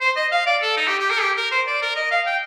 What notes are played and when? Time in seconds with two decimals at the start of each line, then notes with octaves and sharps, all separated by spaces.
0.01 C5
0.16 D#5
0.32 F5
0.46 D5
0.62 A4
0.77 D#4
0.88 G4
0.99 G4
1.11 A#4
1.21 G4
1.37 A#4
1.51 C5
1.67 D5
1.82 A#4
1.96 D#5
2.11 F5
2.26 G5